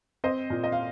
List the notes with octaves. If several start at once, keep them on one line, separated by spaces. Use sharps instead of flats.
C4 C5 D#5
A#2
D#5
F5